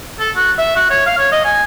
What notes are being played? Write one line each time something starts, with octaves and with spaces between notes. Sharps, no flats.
A4
F#4
E5
F#4
C#5
F5
C#5
D#5
G#5